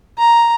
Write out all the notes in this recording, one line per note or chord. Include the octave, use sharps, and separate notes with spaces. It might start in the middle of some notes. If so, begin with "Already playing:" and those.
A#5